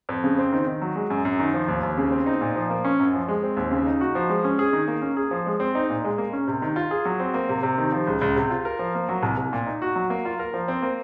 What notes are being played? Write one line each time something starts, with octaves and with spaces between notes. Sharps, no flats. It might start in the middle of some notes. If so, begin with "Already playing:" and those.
F2
C#3
C4
D#3
D#3
F#3
G#3
F#2
F#2
D#3
F3
D#2
D#2
C#3
C4
D#4
A#2
F3
A#3
C#4
F#2
F3
G#3
C4
D#2
C#3
D#4
F#4
F3
G#3
C#4
G#4
D#3
A#3
C#4
G#4
F3
G#3
C4
D#4
A#2
G#3
A#3
C#4
C3
D#3
F4
G#4
F#3
C4
A#3
C3
C3
D#3
F3
C#2
C#2
C3
F4
A#4
F3
A#3
F#3
C2
C2
A#2
D#4
F#4
F#3
A#3
F4
A#4
F3
C4
A#3